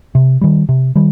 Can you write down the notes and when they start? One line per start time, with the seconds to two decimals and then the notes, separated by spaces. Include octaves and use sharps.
0.15 C3
0.41 D#3 G3
0.69 C3
0.96 D#3 G3